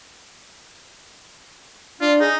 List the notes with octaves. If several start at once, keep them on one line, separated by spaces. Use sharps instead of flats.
D4 F4
D#4 G#4